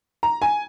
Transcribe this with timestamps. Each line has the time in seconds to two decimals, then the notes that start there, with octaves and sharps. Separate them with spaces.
0.23 A#5
0.42 G#5